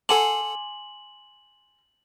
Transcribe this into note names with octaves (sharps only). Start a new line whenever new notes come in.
A4 F#5 G#5 A5 C6 D6 F#7